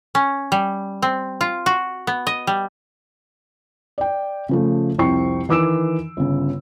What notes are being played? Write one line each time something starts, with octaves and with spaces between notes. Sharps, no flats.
C#4
G3
C4
F4
F#4
B3
D#5
G3
D5 G5
C#3 F3 A3
C2 F2 C4 G5 C#6 C7
D#3 E3 D6 E6 D7 E7
G1 C#3